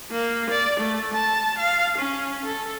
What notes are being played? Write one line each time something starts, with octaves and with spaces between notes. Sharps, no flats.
A#3
D5
A3
A5
F5
C#4
A4